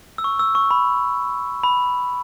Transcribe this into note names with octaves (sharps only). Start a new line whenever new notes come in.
E6
C#6
E6
C#6
B5
B5